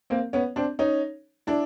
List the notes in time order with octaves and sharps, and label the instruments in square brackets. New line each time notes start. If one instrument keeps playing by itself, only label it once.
[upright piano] A#3 C4
B3 C#4
C4 D4
C#4 D#4
D4 E4